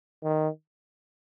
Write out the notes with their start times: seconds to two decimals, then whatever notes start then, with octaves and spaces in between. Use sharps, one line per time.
0.23 D#3